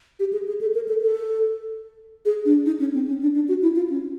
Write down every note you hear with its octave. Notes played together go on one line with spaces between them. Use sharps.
G4
G#4
G#4
A4
A#4
A4
A4
G#4
D4
D#4
C#4
C4
C#4
D4
D4
F#4
E4
F4
C#4